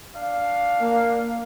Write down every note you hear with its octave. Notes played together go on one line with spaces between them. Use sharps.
D4 F5
A#3